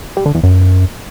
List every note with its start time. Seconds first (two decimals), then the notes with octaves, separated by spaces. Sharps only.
0.17 G3
0.26 D3
0.35 E2
0.43 F#2